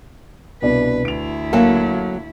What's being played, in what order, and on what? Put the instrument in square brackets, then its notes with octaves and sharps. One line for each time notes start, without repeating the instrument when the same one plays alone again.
[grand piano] C2 B2 D4 [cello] B4
[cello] D2 E4 [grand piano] D7 F7
[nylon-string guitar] F#3 A#3 A4 [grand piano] F5